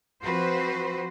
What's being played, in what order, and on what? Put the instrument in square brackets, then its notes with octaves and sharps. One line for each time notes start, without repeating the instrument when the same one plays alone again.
[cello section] F3 C4 F#4 B4 C5